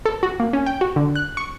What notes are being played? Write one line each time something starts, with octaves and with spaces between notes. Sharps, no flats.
A4
F#4
A#3
C#4
G5
F#4
D3
F#6
C#6